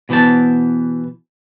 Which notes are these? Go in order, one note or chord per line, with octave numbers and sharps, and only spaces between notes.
B2 E3 B3 C5 A5